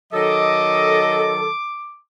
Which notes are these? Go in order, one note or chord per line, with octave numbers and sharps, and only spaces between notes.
D#3 F#3 A4 D#5 D6